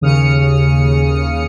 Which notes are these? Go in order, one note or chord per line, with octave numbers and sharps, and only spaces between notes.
D#2 C#3 D#6 F6 C#7